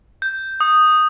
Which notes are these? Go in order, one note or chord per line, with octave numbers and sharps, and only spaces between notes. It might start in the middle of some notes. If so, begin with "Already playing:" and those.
G6
D#6